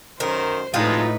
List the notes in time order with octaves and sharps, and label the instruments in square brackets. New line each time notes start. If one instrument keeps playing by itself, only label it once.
[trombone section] F#2 D#3 [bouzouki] A#4 [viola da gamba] C5
[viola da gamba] A2 B4 [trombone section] C3 F3 G#3 [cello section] D#4 [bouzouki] F4 G5